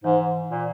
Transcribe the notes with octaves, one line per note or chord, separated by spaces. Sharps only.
G#2 E3
A#2